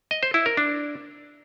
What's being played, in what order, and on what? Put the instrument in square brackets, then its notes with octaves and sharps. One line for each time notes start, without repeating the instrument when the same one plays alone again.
[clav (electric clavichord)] D#5
C5
E4
A#4
D4